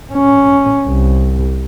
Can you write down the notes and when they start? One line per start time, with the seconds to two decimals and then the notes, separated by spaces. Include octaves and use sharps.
0.13 C#4
0.87 C2